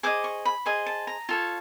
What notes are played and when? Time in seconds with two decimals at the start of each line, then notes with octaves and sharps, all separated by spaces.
0.03 G#4 C5 D#5 D6
0.24 C#6
0.45 B5
0.66 G#4 C5 D#5
0.86 A5
1.07 A#5
1.29 F4 A4 C#5